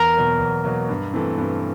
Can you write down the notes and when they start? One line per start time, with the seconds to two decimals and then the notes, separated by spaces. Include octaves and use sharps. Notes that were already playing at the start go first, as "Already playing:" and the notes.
Already playing: E2 A#4
0.15 B2 F#3 A#3
0.39 E2
0.64 B2 F#3 A#3
0.89 G2
1.13 E3 A3 C4
1.38 G2